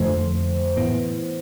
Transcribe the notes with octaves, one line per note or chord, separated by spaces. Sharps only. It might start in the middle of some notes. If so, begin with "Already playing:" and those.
Already playing: F2 D3 F3 A3 C5
A2 E3 B3 E4